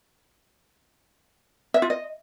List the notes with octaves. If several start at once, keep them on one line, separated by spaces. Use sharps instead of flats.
E5
F4
D#5